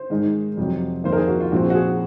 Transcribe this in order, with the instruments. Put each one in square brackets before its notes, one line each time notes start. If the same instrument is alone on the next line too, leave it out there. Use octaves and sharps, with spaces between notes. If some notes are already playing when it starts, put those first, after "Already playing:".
Already playing: [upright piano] C5
G#2 D#3 G#3 D#4
F2 C3 F#3
F2 D#3 A#3 C5
A#4
G#4
F#4
F4
A#1 A#2 F3 C4 F#4
F#4
G#4